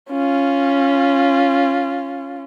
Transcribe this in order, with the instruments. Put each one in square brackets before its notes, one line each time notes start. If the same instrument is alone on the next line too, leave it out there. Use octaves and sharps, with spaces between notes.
[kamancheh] C#4 F4